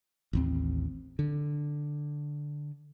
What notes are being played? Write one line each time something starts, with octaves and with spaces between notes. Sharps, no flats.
A1 D#2 C4
D3